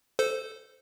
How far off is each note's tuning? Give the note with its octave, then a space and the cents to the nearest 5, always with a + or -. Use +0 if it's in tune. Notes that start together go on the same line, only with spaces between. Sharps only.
A4 +0 C5 -15